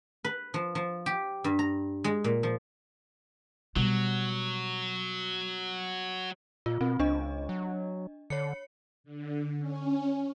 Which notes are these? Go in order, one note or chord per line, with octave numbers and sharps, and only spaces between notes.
B4
F3
F3
G4
G2
A#5
G#3
A#2
F3
B2 F#3 G3
A#2 F4
B2 C4
C#2 D4 D#5
F#3
D3 C#5 C#7
D3
C#4